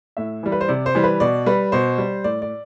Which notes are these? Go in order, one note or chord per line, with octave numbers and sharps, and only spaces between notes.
A2 E5
E3 G3
B4
C5
C3 D5
C5
E3 G3
B4
B2 D5
G3 B4
B2 C5
G3
A2 D5
D5